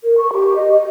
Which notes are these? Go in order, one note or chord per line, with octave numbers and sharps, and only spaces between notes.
A#4
C#6
G4
D#5
D#5